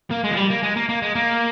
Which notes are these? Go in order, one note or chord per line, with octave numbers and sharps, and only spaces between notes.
A#3
G#3
F3
G3
A#3
G#3
A#3
A#3
G#3
A#3